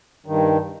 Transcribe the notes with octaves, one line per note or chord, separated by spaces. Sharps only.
G2 D#3